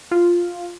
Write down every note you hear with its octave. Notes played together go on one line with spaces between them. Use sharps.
F4